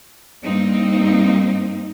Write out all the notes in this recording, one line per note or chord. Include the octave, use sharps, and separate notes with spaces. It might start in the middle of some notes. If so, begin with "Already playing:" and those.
G2 A#3 C4 D#4